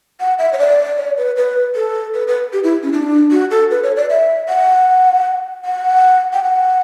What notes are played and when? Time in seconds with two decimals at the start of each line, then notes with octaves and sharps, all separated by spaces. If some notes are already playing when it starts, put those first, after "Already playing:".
0.20 F#5
0.39 E5
0.53 C#5
0.59 D5
0.97 C#5
1.17 B4
1.37 B4
1.76 A4
2.14 B4
2.28 B4
2.53 G4
2.64 E4
2.83 C#4
2.93 D4
3.32 F#4
3.51 A4
3.71 B4
3.83 C#5
3.96 D5
4.10 E5
4.48 F#5
5.65 F#5
6.33 G5
6.44 F#5